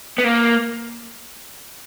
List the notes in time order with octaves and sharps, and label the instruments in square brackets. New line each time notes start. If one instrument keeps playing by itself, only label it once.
[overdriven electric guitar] B3
A#3